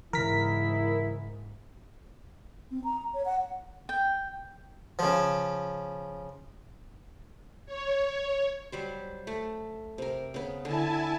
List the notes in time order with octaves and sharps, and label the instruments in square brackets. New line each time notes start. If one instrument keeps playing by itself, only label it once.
[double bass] G#2 [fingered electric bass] C#3 E3 [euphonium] E4 [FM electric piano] A#4 B6
[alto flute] C4
A#5
C#5
F#5
[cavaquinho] G5
[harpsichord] C#3 F3
[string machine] C#5
[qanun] F#3 G3 C5
A3
C3 A#4
C#3 B3
[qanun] D3 [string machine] E4 G#5 A5